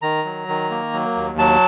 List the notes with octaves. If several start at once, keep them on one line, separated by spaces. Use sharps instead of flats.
D#3 A#5
F#3
D#3
A#3
F#3
D#2
F#3 A5